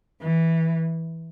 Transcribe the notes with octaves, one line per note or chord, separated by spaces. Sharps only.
E3